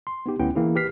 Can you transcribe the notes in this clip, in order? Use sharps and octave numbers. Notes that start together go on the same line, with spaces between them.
C6
B3 D#4 G4
D2 B3 C#4 E4 G5
E3 A#3 E4 G#4
G4 B4 F6 B6 C7